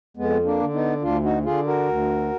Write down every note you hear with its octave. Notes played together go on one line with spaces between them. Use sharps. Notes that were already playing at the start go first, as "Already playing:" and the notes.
F2 G#3 B3
A#3 D4
D3
B3 D#4
D2 D4 F4
D#4 F#4
D3 F4 G#4
F#4 A#4
D2